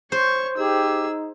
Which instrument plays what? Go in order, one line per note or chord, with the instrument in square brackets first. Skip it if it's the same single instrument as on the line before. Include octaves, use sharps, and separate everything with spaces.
[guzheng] C5 [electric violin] C#5 C#6
[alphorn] D#4 [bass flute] G4 [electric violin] G#4 E6